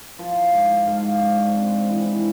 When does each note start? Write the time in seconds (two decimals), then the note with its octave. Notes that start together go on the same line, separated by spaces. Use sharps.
0.19 F3 A5 C6
0.53 G#2
0.87 G#2 F5 A5
1.21 D4
1.55 C4
1.89 E3